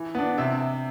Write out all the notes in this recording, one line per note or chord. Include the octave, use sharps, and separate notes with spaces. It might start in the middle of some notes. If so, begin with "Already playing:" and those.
Already playing: E3
B3 D4
C3 E5